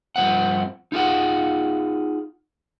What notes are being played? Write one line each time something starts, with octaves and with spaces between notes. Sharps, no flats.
G2 D#3 F3 C4 F#5
D#4 F4 G#4 F#5